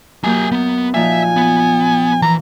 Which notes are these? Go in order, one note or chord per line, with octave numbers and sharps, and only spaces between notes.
F#2 A#3 G4 G#5 G6
B3
A#2 F3 D#4 E5 G#5
B3
E3 A#5